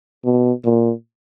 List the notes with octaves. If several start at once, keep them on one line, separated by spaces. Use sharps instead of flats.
B2
A#2